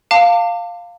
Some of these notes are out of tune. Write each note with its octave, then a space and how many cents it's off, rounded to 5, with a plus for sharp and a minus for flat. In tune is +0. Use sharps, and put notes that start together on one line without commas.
F5 +0 A5 +40 D6 +0